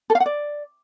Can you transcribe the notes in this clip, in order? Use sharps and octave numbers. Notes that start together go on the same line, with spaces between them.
A4
F5
F#5
D5